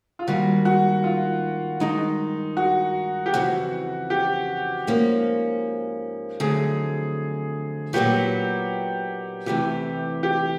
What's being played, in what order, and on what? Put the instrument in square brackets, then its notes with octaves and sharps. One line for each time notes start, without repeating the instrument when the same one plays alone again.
[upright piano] F4
[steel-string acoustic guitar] G#2 D#3 G3 A#3 [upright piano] F#4
[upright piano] F#4
F4
[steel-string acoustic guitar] G2 D#3 G#3 [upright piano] D#4
[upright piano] F#4
G4
[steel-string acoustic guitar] F2 C#3 E3 [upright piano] F#4
[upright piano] G4
[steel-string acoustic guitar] G#2 F3 A#3 C#4
[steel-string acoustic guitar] F2 D3 F#3 A3 [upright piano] G#4
[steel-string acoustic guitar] A#2 F#3 B3 D#4 F#4 [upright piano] G4
[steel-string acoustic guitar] E2 C3 E3 A3 [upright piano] G4
[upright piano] G4